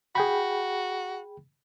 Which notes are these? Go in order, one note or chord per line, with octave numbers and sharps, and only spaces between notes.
F#4 G#4 G5 B5